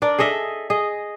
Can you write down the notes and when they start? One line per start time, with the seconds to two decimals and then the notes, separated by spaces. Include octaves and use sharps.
0.02 D4 A#4 D5
0.18 G#4 A4 D#5 E5
0.70 G#4 D#5